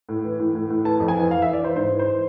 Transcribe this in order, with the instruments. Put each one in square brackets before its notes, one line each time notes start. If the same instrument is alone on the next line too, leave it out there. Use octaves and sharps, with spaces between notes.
[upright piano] A2
E3
A2
A2
A2
E3 A5
F2
G#5
E3
E3 F5
E5
E3
D5
E3 C5
G#2 C5
E3
C5
E3